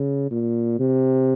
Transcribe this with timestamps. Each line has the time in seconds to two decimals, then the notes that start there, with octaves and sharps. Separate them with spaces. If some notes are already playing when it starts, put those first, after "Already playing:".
Already playing: C#3
0.31 A#2
0.79 C3